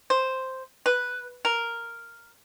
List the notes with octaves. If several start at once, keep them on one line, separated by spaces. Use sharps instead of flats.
C5
B4
A#4